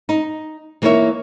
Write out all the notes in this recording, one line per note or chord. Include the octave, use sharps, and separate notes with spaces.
D#4
E3 A#3 D#4 A4 C#5 E5